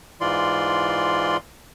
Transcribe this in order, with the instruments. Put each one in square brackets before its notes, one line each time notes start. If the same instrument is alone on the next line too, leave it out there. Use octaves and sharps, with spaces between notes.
[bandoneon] G#2 E3 F4 D5 C6